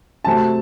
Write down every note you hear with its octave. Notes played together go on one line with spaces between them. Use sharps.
C3 F#3 A3 C4 A5